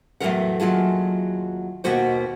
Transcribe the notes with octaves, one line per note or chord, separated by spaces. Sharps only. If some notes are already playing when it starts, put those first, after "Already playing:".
E2 A2 E3 F#3 A#4 F#5
D#2 F#3 F4 G#4 A5
D#2 B2 A#3 F#4 C5